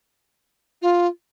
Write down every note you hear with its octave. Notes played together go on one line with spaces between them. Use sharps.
F4